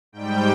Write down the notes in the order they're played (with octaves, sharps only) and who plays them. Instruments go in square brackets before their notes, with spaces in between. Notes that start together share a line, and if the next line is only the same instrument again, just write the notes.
[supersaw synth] G#2 G3 G5